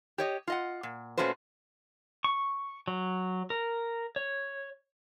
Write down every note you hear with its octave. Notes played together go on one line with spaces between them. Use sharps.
G4 C#5 D#5
F4 D#5 F#5
A#2
A#2 A3 C#4 F#4 B4 C5
C#6
F#3
A#4
C#5